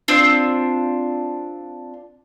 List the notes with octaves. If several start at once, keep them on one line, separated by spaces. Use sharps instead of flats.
C4 D4 F4